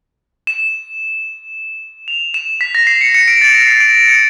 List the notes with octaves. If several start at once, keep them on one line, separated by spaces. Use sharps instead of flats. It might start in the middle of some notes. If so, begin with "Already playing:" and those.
E7
F7
E7
B6
A#6
C7
C#7
C#7
D7
A6
A#6
C7
D7
D7
C#7